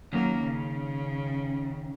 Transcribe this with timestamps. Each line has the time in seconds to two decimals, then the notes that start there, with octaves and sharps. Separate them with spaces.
0.13 D#3 F#3 A#3 C#4
0.44 C#3